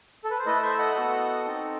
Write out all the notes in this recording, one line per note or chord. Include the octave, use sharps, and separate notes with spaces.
A4
B4
C5
A3 E4 A4 B4 D#5
C5 E5
D#5 F#5
B3 F#4 A4
C4 D#4 A4